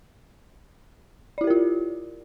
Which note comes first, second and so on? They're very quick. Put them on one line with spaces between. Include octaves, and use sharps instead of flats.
D5 E4 G4 A#4 F4